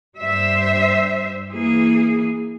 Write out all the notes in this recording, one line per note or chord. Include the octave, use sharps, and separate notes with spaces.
G2 G3 C5 E5
E3 A#3 G#4